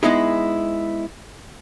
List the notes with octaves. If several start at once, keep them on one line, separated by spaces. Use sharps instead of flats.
G#3 B3 D#4 E4 G#4